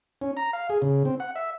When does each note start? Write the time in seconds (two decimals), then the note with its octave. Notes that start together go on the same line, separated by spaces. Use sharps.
0.21 C#4
0.37 A#5
0.53 F5
0.70 G#4
0.82 C#3
1.05 C4
1.20 F#5
1.36 E5